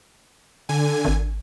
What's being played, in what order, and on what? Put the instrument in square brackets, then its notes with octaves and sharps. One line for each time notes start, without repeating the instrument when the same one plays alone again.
[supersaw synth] D3 G#5
[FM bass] G#1